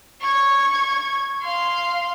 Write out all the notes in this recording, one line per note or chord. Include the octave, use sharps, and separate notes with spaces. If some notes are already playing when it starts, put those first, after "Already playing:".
C#6 G#6
F5 C6